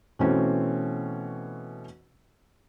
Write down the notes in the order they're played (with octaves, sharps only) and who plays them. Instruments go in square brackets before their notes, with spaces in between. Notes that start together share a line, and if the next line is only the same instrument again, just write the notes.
[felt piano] B2 E3 A3 C4 C#4